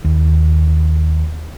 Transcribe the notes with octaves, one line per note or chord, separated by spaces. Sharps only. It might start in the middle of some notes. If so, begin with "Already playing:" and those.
D#2